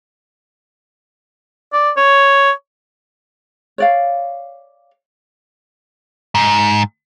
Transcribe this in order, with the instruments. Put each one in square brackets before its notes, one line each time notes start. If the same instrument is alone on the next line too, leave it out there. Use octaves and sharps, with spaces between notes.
[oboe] D5
C#5
[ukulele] C#5 D5 F5
[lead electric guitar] G#2